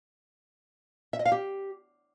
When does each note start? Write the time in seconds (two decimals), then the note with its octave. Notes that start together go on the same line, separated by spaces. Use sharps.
1.13 E5
1.19 D#5
1.26 F5
1.32 G4